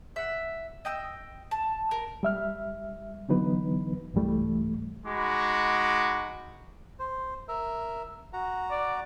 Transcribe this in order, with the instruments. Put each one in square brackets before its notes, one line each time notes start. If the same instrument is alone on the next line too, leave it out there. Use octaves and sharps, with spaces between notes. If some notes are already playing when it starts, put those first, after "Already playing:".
[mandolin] E5 F#5
D#5 G5 E6
A5
A#4
[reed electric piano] G3 E5 F6
D3 E3 F#3 B3 D#4 B4
C2 G#2 E3 G3 A3
[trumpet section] G#3 D#4 F#4 B5 D6
[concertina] C5
A#4 E5
F#4 F#5 A#5
[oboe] D5